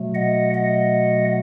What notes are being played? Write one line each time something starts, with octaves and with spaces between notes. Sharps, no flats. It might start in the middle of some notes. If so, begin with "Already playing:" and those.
Already playing: B2 F#3 A3
D#5 F#5
D#5 F#5